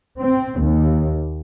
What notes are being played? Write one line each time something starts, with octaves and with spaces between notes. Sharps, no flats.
C4
D#2